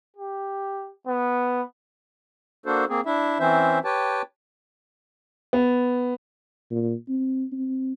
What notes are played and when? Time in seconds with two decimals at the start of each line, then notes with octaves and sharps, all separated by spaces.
0.16 G4
1.07 B3
2.66 A#3 D4 F#4 A4 C5
2.89 A#3 C4 G#4
3.06 D4 E4 E5
3.40 E3 C4 C#4 C5 E5
3.85 G4 B4 C#5 G5 A5
5.53 B3
6.71 A#2
7.08 C4
7.52 C4